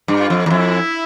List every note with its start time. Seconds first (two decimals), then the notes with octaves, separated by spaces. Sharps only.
0.08 G2
0.19 F4
0.30 F2
0.46 E2
0.50 F2 E4